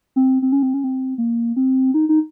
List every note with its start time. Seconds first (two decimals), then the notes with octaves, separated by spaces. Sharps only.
0.16 C4
0.42 C4
0.52 C#4
0.63 C4
0.74 C#4
0.84 C4
1.18 A#3
1.56 C4
1.94 D#4
2.09 D#4